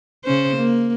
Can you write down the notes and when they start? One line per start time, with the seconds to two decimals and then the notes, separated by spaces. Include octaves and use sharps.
0.24 C#3 C#4 C5
0.57 A#3